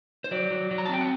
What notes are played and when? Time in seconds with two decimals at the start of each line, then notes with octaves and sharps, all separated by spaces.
0.24 C5
0.31 F#3 D5
0.50 F#3
0.71 F#3
0.78 A#5
0.86 A5
0.89 C4 G5
1.01 F#5